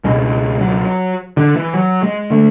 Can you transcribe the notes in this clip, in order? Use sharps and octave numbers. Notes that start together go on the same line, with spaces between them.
C#2 B2 G#3
F#3
D3
E3
F#3
G#3
D3 A3